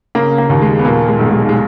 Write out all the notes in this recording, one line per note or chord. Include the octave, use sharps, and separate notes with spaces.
C#3 A#3
A#3
D#2
G#3
B3
A#2 A#3
G#3
B1
G#3
G#3